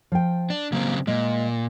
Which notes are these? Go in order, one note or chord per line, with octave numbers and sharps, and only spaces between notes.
F3 G5
D4
C#3 F#3 A#3 C4
A#2 G#3